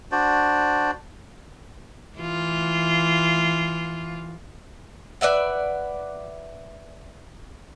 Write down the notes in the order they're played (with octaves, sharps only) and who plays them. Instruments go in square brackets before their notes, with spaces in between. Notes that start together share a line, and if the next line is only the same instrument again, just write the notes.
[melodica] D4 F#4 C5 D5
[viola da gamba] E3 F4
[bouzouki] B4 D5 E5 F#5